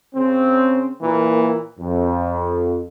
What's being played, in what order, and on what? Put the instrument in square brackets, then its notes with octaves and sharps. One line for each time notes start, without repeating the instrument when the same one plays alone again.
[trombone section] C#3 C4
A#2 E3 A#3
F2